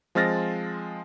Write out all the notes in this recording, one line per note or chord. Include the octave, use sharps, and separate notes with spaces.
F3 G#3 C4 F6 A6 A#6